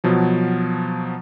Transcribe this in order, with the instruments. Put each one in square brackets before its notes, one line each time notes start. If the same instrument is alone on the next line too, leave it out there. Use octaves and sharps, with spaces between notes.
[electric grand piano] B2 F3 F#3